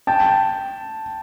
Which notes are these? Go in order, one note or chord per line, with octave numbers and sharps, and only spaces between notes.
G5 A5